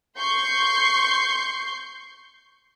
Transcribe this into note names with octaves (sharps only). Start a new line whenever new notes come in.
C6 C#6 G6 C7